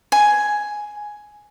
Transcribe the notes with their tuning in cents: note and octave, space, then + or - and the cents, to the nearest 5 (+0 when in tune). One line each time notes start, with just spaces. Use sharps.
G#5 +5